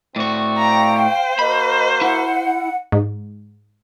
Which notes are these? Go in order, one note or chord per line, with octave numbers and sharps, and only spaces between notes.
A2 C4 F#4 D5 C#6
F5 G5 A#5
C5
A#3 F#4 A#4 D#5 B5
E4 F#5
G#2